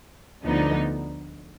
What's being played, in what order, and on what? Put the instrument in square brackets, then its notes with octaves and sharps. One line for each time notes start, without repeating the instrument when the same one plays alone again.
[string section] D2 D3 F3 B3 D#4